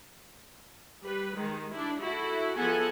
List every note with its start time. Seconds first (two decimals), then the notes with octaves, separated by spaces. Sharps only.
1.05 G3 B4
1.38 D#3 G#3
1.73 D4 E4
2.02 E4 F#4 A4
2.57 F3 B3 G#4 A4 F#5 G#5